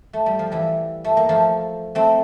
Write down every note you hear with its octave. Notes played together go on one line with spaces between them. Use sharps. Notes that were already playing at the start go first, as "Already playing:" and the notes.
A3
G3
F3
E3 G3
A3
A#3
F3 A3
A3 C4